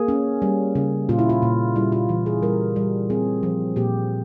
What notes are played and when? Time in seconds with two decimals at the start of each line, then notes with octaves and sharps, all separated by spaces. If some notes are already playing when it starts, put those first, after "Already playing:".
Already playing: A#3 G#4
0.08 C#4
0.42 G3
0.75 C#3
1.09 A#2 F4
1.19 E4
1.29 F4
1.42 A#2
1.76 G3 E4
1.92 F4
2.09 E3
2.26 G#4
2.43 G3 A#4
2.76 G3
3.10 C4 G#4
3.43 F3
3.76 A#2 G4